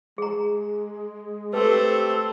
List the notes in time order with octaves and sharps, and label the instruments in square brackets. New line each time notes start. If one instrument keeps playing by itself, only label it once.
[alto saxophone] G#3 [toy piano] G#4 A#5
[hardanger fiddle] A3 C5 [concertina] C4 A4 [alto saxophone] G4 [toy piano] B4